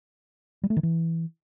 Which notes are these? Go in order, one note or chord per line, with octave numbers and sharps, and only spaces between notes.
G3
A3
D#3
E3